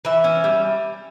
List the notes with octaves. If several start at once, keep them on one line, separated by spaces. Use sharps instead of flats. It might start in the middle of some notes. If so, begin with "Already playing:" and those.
E3 E5
C#4
G3